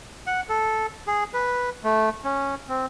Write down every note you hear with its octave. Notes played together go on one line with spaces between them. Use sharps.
F#5
A4
G#4
B4
A3
C#4
C4